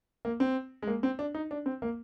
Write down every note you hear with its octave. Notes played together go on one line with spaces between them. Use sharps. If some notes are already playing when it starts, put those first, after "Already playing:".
A#3
C4
G#3
A#3
C4
D4
D#4
D4
C4
A#3